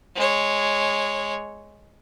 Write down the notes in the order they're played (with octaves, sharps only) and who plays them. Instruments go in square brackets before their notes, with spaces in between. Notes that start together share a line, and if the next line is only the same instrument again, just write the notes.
[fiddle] G#3 C#5